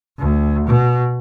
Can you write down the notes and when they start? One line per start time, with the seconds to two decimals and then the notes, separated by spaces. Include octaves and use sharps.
0.19 D2
0.67 B2